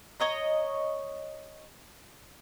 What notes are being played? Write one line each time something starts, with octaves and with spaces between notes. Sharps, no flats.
C#5 D#5 A#5